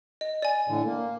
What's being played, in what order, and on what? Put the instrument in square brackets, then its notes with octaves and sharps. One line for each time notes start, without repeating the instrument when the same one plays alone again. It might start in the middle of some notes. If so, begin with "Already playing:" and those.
[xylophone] D#5
D5 G#5
[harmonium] A2 D3 E3
A#3